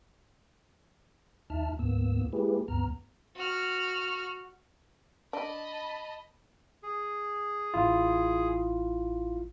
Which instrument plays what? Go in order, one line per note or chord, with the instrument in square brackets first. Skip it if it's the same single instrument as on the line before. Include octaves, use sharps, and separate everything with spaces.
[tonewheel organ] D#2 D#4 E5 A5 F6
D2 G#2 A#3 B3 E6
G#3 A#3 E4 G4 G#4 B4
D2 G2 B3 A#5 F6
[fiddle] F#4 F6
[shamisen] D4 [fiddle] D#5 [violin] A5 B5
[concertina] G#4
[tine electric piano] A1 E4 F4